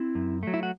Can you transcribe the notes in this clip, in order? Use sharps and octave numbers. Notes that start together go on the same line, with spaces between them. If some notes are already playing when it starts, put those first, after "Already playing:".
Already playing: C4 E4
F#2
F#3 A3
E4
F#4